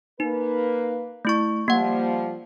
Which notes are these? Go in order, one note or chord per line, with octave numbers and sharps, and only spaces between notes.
A#3 D#4 B4
A3 E4 C#6
F3 G3 A#3 F#5